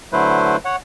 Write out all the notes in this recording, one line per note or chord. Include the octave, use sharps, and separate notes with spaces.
D3 F#3 A3 E4 B4 C5
C#5 F#5